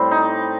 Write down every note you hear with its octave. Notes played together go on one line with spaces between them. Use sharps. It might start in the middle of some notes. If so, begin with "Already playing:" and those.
Already playing: A2 G3 C4
D#4